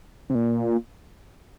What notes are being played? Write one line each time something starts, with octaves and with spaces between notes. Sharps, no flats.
C3
A#2